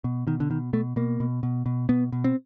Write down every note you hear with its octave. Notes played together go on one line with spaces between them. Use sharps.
B2
B2 D#3
D3
B2 D#3
B2 A3
B2 A#3
B2
B2
B2
B2 B3
B2
C4